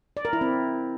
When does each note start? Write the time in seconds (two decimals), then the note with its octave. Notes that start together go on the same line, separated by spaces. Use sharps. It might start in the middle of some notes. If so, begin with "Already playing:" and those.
0.17 D5
0.25 A#4
0.33 E4
0.41 C4